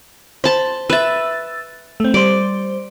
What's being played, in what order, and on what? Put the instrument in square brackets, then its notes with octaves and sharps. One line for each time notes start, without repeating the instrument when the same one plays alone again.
[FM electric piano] C5 [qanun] A5 B5
[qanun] B4 E5 [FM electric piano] E6 A6
[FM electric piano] A3 C4
[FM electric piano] G3 C5 [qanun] D5